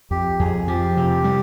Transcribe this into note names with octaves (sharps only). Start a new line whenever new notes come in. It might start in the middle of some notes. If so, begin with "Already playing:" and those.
F2 G4
F2 G#4
F3 G4
C3
G3